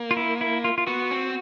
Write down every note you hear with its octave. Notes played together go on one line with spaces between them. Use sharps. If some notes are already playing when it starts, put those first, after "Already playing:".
Already playing: A#3
F4
E4
E4
F4
F4
B3 F#4
C4